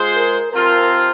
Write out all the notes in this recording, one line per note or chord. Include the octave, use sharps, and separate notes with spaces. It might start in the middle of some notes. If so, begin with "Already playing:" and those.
Already playing: G#3 F4 G#4 C5
A#4
C3 F3 C4 F4 A#4